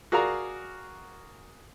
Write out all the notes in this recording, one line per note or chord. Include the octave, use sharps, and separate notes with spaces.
F#4 G#4 A#4 D5 F5 A#5